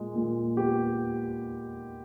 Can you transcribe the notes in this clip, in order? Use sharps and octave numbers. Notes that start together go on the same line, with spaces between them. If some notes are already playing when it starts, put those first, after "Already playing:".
Already playing: A#2 G#3
A#2
B3 G4